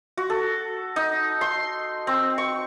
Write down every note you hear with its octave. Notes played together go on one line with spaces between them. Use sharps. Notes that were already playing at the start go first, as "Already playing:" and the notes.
F#4
A4
D#4
C6
C4
C#6